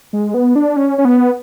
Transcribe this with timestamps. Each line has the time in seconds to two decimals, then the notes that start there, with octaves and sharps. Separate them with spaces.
0.13 G#3
0.34 B3
0.55 D4
0.77 C#4
0.98 C#4
1.05 B3